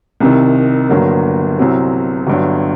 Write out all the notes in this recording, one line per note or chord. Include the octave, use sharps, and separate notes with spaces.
C2 C3 D#3
G1 G2 F#3 A#3
C2 C3 F#3 C4
G1 G2 F#3